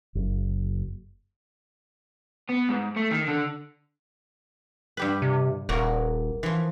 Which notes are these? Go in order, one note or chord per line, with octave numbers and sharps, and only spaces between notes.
F#1
B3
G#2
A3
D#3
D3
G2 G4 B4
C3
D#1 A#3 F#4 A#4
E3 F3